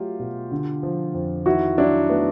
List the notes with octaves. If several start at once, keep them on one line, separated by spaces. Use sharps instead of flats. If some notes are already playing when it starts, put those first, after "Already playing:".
Already playing: F#3 A3 F4 G4
B2
D3
F3
F2
D#3 E4 F#4
F#3 D4 E4
A3 B3